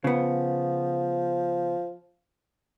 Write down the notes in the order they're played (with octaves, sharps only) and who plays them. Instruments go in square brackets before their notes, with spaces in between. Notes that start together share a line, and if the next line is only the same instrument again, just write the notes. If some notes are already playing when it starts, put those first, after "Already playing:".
[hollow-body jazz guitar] C#3 B3 [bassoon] F3